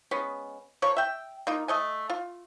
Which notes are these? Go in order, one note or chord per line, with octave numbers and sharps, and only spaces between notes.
G#3 B3 C#4
F3 A#4 C#5
E5 G5
A#3 D#4 F4
A3 D#5 G#5
F4